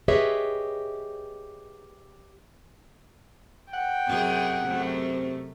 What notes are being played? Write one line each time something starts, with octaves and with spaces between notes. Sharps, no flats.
G4 G#4 B4 C#5 D#5 E5
F#5 G5
F#2 C3 G#4
F#2 C3 A3